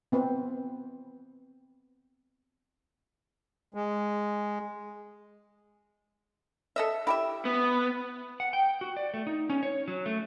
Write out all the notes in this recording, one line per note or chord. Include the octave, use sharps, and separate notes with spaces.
B3 C4 B4
G#3
A4 D#5 E5
E4 G4 E5
B3
F#5
G5
F#4
D5
A3
D#4
C#4
C#5
F#3
A3